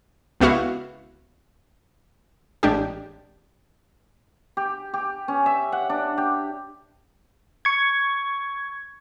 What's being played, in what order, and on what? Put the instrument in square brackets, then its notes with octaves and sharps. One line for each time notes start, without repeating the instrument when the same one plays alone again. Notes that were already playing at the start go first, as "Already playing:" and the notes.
[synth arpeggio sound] C#2 B3 E4 F#4 F5
A1 G#3 D4 G4
[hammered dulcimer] G4
G4
C#4
E5
F#5
D4
G4
[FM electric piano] C#6 G#6